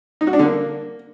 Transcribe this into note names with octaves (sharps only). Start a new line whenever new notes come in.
D#4
F#4
D4
D3
A#3